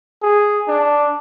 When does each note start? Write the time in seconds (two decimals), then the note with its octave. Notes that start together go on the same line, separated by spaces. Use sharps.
0.22 G#4
0.68 D4